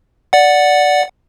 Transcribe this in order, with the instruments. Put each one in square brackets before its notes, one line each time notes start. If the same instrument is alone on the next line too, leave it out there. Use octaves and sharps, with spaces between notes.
[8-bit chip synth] D5 F#5